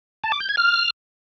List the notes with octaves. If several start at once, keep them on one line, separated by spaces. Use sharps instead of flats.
A5
D6
G6
G#6
F6